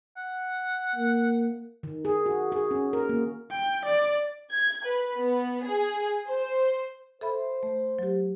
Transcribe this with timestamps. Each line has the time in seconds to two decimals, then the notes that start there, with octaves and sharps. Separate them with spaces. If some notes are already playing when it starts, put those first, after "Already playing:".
0.17 F#5
0.96 A#3
1.83 D#3
2.05 G#4
2.26 F#4
2.52 G#4
2.71 C#4
2.93 A#4
3.09 A#3
3.51 G5
3.85 D5
4.52 G#6
4.85 B4
5.16 B3
5.65 G#4
6.29 C5
7.21 A4 C5 E5 B5
7.63 A3
7.99 F#3 G4